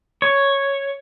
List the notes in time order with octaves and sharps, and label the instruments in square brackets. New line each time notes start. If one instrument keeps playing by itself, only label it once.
[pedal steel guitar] C#5